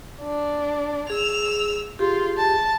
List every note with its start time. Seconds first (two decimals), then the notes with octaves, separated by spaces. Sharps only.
0.22 D4
1.10 G#4 E6 F7
1.99 F4 G4 G#4
2.37 A5